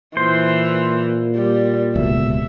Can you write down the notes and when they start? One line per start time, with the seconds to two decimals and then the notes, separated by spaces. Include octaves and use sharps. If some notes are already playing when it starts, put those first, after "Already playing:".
0.17 A#2 E3 C5
1.36 G3
1.95 D1 C#2 B2 E5